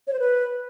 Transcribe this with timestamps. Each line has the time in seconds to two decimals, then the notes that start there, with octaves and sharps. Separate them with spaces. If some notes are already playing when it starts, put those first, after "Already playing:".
0.07 C#5
0.13 C5
0.19 B4